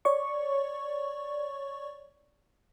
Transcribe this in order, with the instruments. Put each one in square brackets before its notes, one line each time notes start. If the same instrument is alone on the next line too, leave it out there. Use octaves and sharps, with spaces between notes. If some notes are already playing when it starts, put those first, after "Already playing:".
[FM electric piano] C#5 D5 C#6